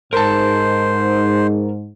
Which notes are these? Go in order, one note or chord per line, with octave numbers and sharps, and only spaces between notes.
G#2 A#4 C5 A5